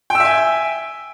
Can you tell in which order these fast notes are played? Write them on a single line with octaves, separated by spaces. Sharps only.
G5 E6 E5 G#5